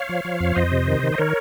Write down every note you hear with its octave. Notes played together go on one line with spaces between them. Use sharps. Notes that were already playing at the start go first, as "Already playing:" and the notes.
Already playing: C#5 F5
F3
F3
F2 C#5
F2 C5 D#5
C3
D#3
D#3
D#5
D#3 A#4 C#5